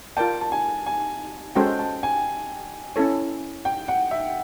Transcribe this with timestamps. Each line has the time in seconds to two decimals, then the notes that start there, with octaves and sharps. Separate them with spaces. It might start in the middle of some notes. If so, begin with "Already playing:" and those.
0.17 F4 A#4 D5 G5 A5
0.41 A5
0.52 G#5
0.86 G#5
1.55 G#3 C#4 F#4 A4 C5 G5
1.79 A5
2.03 G#5
2.96 C#4 E4 A4 C#5
3.65 G5
3.88 F#5
4.11 E5